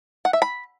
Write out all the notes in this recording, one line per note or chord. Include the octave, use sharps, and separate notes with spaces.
F#5
E5
B5